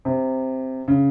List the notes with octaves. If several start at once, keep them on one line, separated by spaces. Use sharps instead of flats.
C3
C#3